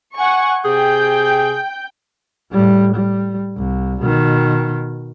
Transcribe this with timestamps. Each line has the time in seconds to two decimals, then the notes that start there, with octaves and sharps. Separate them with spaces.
0.16 F#5 G#5 C#6
0.65 C3 G#4 G5 G6
2.52 A2 G3
2.96 G3
3.57 C2
4.01 B2 D#3